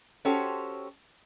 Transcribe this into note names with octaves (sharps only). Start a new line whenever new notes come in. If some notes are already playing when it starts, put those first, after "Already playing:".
C#4 F#4 G4 A4 C5 C#5